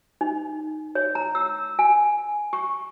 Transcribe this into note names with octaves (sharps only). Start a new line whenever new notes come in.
D#4
C#5
A#5
E6
G#5
C#6